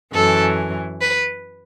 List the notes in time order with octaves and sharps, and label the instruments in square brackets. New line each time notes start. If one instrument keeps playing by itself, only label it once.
[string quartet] F#2 E3 A4
B4